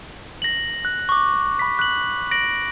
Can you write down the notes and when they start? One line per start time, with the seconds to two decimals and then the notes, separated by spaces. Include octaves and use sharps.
0.42 A#6 F#7
0.85 F#6
1.09 C#6 D6
1.59 B5 B6
1.79 F#6 F#7
2.31 A#6 D7 F#7